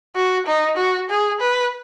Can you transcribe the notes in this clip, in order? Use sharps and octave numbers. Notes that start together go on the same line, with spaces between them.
F#4
D#4
F#4
G#4
B4